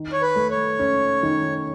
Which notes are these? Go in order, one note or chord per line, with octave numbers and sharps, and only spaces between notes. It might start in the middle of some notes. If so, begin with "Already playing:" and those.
Already playing: D#3
C#5
B4
A3
C#5
C#4
D#3